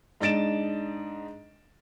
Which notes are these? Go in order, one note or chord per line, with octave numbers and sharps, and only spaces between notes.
G#2 D4 D#5 A6 D7 E7